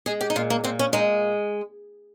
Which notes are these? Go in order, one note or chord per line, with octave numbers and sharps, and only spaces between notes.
G#3 G#4
G4
D#4
A#2 F4
A#3
A#2 C4
C#4
G#3 D#4